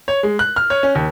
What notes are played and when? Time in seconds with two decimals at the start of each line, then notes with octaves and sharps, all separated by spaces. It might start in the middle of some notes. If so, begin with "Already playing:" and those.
0.08 C#5
0.23 G#3
0.39 F#6
0.56 F6
0.70 C#5
0.83 C#4
0.95 D#2